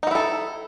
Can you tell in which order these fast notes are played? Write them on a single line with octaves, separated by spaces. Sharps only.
D#4 F#4 E4 A4